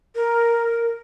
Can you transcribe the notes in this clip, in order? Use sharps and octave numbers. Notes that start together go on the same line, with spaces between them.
A#4